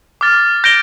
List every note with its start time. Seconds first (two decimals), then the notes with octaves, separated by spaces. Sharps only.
0.21 D6 F6 A6
0.64 G6 A#6 D7 G7